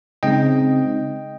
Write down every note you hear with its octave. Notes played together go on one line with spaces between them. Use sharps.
C#3 G#3 C4 D#4 D#5 G5